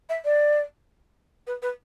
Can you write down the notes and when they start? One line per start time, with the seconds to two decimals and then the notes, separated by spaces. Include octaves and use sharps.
0.09 E5
0.25 D5
1.47 B4
1.62 B4